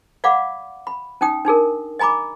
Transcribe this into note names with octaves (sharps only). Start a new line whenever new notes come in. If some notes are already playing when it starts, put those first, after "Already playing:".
D5 F5 F#5 B5 D6
B5
C#4 D#4 G5 D#6
D4 D#4 G#4 A#4
D#5 G#5 A#5 B5 D6